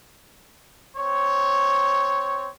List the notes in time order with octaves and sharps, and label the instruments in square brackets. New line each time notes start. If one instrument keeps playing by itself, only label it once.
[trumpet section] C4 C#5